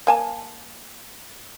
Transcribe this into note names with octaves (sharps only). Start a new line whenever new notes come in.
A#3 G#5 A5